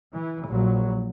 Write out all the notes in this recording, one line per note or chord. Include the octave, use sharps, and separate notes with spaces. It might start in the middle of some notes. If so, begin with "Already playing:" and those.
E3
A#1 F#3